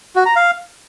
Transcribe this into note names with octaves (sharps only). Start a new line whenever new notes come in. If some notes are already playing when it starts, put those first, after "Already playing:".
F#4
A#5
F5